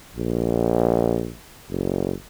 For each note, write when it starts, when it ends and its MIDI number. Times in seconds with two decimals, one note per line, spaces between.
0.16 1.34 34
1.70 2.13 30